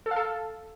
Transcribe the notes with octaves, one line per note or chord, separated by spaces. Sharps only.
A4
F5
A4